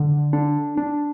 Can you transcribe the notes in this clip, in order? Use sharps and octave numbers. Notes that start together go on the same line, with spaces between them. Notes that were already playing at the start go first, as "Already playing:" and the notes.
Already playing: D3
D4
D4